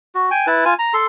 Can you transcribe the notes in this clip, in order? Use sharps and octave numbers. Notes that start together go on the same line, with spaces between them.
F#4
G5 G#5
E4 B4 A5
F4 G#5
A#5
A4 C6